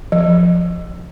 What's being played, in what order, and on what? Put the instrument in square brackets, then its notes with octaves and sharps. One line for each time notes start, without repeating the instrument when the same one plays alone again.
[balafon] F3